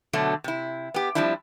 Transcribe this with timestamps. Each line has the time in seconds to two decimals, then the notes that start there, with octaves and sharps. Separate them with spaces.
0.13 B2 D3 F#3 A3
0.44 C3 E4
0.94 B3 G4
1.15 F3 G3 C4 D4 E4